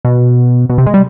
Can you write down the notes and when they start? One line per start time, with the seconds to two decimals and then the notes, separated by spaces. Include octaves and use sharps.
0.05 B2
0.69 B2
0.78 C3
0.86 G#3
0.94 G3